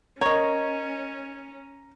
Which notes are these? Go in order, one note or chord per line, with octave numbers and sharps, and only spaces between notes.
C#4 A#4 C#5 D#5 A#5 C#6